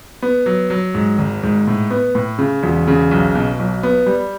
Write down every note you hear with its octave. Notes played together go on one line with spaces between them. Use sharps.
B3
F#3
F#3
G#2
G#1
G#2
A2
B3
A2
C#3
E1
C#3
B1
B2
B1
B3
G3